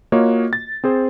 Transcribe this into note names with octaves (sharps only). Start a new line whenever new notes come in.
A#3 F4 F#4 C#5 D#5
A6
C4 G#4 C5